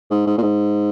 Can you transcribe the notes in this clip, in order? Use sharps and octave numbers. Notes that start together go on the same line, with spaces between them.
G#2
G#2
A#2
G#2